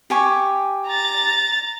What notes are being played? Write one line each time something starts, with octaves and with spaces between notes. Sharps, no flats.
G4 G#5 C#6
A#5 A6